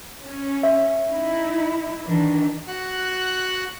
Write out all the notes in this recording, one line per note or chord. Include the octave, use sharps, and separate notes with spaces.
C#4
E5
D#4 E4
D#3 E3 D4
F#4 F#5 F#6